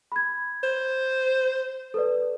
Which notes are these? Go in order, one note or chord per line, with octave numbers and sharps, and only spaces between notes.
B5 G#6
C5
A4 B4 D5